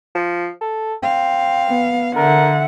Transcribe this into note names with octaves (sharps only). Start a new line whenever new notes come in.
F3
A4
C4 F5
B3
D3 A#4 E5 F#5